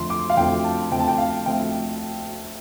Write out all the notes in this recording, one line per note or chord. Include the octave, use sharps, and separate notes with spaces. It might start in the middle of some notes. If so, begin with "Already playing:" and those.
Already playing: F2 D3 F3 A3 C4 C6
D6
F5
F2 D3 F3 A3 C4 G5
A5
F2 D3 F3 A3 C4 G5
A5
G5
F5
D3 F3 A3 C4 G5